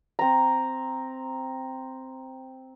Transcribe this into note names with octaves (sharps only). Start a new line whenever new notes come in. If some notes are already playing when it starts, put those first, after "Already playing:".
C4 A#5